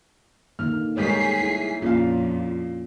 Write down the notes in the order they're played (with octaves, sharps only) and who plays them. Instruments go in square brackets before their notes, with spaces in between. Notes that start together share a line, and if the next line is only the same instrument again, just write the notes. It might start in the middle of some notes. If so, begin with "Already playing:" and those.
[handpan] D3 D#3 A#3 [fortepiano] F6
[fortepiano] G#2 D#3 G3 [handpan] A3 C#5 [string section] G#4 B6 C7
[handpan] E4
[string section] F2 [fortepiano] A#2 F5 [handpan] A#3 C#4 F4